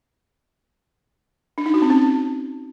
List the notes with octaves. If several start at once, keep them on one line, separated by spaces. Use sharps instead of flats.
D4
D#4
F#4
C4
C#4